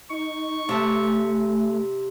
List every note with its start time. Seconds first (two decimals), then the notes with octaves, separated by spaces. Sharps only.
0.10 D#4 C#6
0.69 C3 A3 A5